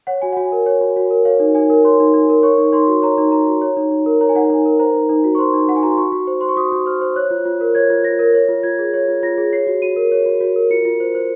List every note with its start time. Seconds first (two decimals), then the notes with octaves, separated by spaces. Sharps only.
0.07 C#5 F#5
0.22 F#4 G#5
0.32 F#5
0.37 F#4 G#5
0.52 A#4
0.66 C#5
0.81 F#4
0.96 F#4
1.11 A#4
1.25 C#5 F5
1.40 D#4
1.55 D#4 G#5
1.70 A#4
1.85 C#5 C6
2.00 D#4
2.14 D#4
2.29 A#4
2.43 C#5 C#6
2.58 D#4
2.73 D#4 C6
2.88 F#4
3.02 C#5 A#5
3.18 D#4
3.32 D#4 A#5
3.48 F#4
3.62 C#5
3.77 D#4
3.91 D#4
4.06 A#4
4.21 C#5 A#5
4.29 G#5
4.35 D#4 F#5
4.44 G#5
4.50 D#4
4.66 A#4
4.79 C5 A#5
4.95 D#4
5.09 D#4
5.24 F#4
5.35 C#6
5.38 C5 C6
5.54 D#4
5.68 D#4 F#5
5.76 G#5
5.83 F#4 A#5
5.91 C6
5.98 F#4 C#6
6.12 F#4
6.27 C5
6.41 C5 C6
6.49 C#6
6.57 F#4 D#6
6.72 F#4
6.86 C5 F6
7.02 C5
7.16 C#5 F#6
7.31 F4
7.45 F4
7.61 A#4
7.75 C#5 G#6
7.90 F4
8.04 F4 A#6
8.19 A#4
8.35 C#5
8.48 F4
8.63 F4 G#6
8.79 G#4
8.94 C#5
9.08 F4
9.23 F4 A#6
9.38 G#4
9.53 C#5 C7
9.67 F#4
9.82 F#4 D#7
9.96 A#4
10.12 C#5
10.26 F#4
10.41 F#4
10.56 A#4
10.70 F4 C#7
10.85 F4
11.00 C5
11.15 C5